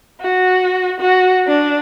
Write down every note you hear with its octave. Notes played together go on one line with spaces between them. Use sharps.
F#4
F#4
D4